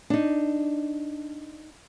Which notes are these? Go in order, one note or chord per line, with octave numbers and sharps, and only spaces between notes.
D4 D#4